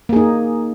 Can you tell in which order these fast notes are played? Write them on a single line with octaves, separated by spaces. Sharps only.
A#3 G#4 D#4